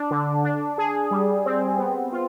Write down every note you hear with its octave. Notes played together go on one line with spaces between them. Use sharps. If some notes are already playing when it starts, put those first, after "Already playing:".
Already playing: D4
D3
D4
G#4
G3
C4
B3
F4